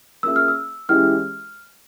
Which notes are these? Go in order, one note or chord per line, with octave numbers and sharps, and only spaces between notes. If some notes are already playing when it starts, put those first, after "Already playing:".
A#3 C#4 F4 G#4 E5 E6
F6
E6
E3 G#3 C#4 E4 G4 F6